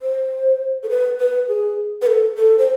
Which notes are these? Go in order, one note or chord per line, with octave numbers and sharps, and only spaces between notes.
C5
A4
B4
B4
G#4
B4
A4
A4
C5